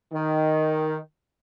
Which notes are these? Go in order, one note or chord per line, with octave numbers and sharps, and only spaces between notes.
D#3